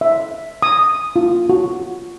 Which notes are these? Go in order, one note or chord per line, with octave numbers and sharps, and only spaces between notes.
E5
D#6
F4
F#4